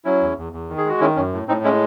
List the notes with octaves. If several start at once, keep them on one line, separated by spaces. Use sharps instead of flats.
F#3 C#4 E4
E2
E2
E2
D#3
G#4
G#3 F#4
D#3 C#4 E4
F#2 C#4
A2
A2 C4 D#4
G#3 C#4 E4